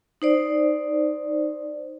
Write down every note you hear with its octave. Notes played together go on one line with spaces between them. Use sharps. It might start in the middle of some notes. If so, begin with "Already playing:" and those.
D#4 C5 D5